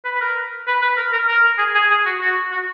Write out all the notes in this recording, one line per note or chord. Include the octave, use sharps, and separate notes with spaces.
B4
B4
A#4
B4
B4
A#4
A#4
A#4
G#4
G#4
G#4
F#4
F#4
F#4